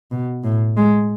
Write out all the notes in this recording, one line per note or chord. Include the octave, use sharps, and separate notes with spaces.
B2
A2
G#3